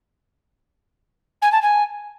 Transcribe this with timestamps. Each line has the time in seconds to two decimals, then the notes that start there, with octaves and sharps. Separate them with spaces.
1.42 G#5
1.52 A5
1.62 G#5